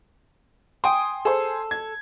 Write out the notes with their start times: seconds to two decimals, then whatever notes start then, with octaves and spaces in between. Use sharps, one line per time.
0.84 G5 G#5 C6 D#6
1.25 G#4 A4 C5
1.71 G#6